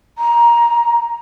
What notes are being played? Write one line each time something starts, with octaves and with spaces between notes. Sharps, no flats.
A#5